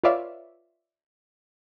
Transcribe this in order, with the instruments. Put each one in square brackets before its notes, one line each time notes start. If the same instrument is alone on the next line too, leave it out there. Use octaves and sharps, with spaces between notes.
[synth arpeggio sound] F4 B4 C#5 D5 E5 F5